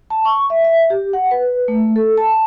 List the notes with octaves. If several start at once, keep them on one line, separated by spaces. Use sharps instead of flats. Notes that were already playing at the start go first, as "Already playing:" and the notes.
A5
C#6
E5
E5
G4
F#5
B4
A3
A4
A5